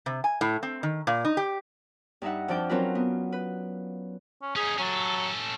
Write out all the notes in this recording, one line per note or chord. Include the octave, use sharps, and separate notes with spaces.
C3
G#5
A2
C4
D#3
A#2
D#4
G4
G2 D#4 E5 F#5
F2 F3 D4 D5 G5
F#3 C4 C#4 F4 A#4 B4
B3
B4
C#4
C#4 D#4 G#4
F#3 C#4 A4